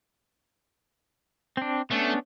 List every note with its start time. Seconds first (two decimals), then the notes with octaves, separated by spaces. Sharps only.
1.57 C4 D4
1.91 A3 B3 C#4 D4